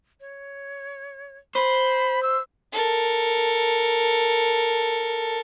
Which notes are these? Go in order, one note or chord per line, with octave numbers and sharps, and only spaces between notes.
C#5
C5 B5
E6
A4 A#4